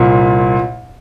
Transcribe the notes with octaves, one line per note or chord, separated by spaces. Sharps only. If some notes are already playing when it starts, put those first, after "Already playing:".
Already playing: C2 A#2